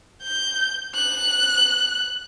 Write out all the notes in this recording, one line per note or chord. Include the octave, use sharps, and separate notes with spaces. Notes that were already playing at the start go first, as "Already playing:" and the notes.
G6
F#6